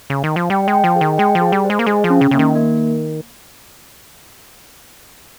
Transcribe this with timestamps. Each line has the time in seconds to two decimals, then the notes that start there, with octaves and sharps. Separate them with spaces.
0.10 C#3
0.24 D#3
0.36 F3
0.50 G3 G5
0.68 G#3
0.73 G5
0.84 F3
0.96 G#4
1.01 D#3
1.18 G#3 G5
1.35 F3
1.41 G#4
1.52 G3
1.65 C5
1.70 G#3
1.79 A#3
1.87 G#3 G#4
2.04 F3
2.10 C#4
2.21 C#3
2.31 C#3 A#3
2.39 D#3
2.55 A#3